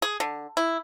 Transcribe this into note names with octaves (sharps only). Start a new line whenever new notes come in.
G#4
D3
E4